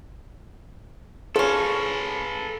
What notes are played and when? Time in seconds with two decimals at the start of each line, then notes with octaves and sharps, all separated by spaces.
1.36 F3 C#4 G#4 A4 B4